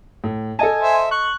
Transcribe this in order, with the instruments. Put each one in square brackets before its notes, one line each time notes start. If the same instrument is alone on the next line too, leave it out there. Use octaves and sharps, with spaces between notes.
[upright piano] A2
[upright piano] A4 D#5 A5 [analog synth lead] G#5
[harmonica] C5 E5
[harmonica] C#6 [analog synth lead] F#6